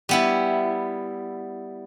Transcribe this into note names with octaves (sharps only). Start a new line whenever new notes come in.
G3 B3 E4